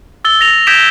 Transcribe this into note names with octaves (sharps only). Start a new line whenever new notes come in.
E6 A6 G7
A#6 F7
D#6 G6 G#6 B6 D7 E7